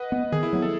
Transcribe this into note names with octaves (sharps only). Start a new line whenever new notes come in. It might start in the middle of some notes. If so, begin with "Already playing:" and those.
Already playing: B4 D#5 F#5
B3
D#3 G#4
E4
F#3 B3
A4